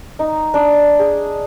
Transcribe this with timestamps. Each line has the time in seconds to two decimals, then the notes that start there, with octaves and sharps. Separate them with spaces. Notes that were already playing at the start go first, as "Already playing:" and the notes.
0.19 D#4
0.54 D4
0.99 G#4